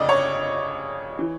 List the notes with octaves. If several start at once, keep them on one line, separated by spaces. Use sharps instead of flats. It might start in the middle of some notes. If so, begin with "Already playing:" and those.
Already playing: G1 F2 C#3 D5 D#5
C#5
E3